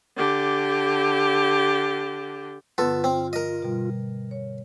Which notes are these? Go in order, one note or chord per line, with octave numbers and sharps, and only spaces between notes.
D3 G4
G2 D3 B3 F4 A4
C4
A#4 D#5
B2 G3
C#5